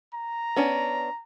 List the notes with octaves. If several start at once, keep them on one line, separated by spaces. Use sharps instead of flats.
A#5
B3 C#4 D4